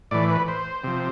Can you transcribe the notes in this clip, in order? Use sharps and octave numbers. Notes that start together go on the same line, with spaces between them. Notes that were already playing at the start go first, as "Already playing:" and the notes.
A2 E3 D5
B4
C5
C3 F3